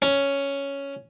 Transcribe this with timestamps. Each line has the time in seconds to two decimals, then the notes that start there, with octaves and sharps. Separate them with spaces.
0.02 C#4